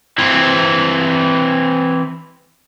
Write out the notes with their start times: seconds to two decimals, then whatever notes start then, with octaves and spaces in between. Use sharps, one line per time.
0.19 E3 C4